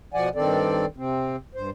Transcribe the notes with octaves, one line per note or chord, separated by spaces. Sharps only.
B2 F3 D5 F#5 G#5
G2 D#3 C4 A4 D5
C3 C4
G2 C5